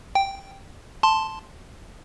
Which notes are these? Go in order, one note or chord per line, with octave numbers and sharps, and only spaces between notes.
G5
A5 C6